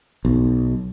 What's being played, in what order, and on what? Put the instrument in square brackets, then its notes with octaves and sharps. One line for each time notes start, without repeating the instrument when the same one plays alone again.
[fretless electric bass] B1